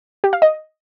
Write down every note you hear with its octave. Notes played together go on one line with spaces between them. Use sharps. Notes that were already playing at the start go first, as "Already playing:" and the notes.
G4
F5
D#5